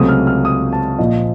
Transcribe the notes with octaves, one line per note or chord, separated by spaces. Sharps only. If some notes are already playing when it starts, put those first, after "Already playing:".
Already playing: C#2 C3 F#3 A3 C4 D#6
F6
F6
D#6
A5
A#1 A#2 F3 D#5